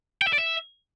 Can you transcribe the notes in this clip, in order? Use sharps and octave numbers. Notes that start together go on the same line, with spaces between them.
G5
E5
D5
E5